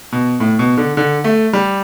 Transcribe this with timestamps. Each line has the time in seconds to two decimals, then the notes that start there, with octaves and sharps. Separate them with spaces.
0.12 B2
0.40 A2
0.59 B2
0.77 D3
0.97 D3
1.24 A3
1.53 G3